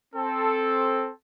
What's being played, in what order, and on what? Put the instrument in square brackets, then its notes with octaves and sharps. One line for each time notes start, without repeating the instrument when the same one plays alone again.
[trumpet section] C4 A4